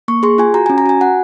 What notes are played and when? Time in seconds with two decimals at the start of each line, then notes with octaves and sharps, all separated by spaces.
0.08 A#3 C#6
0.23 G#4 C6
0.38 F4 G#5
0.54 F#4 A#5
0.66 G#5
0.70 C#4
0.78 A#5
0.86 F#4 G#5
1.01 F#4 F#5